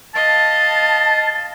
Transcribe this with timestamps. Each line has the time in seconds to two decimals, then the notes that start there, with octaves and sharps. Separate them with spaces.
0.14 D#5 F5 A5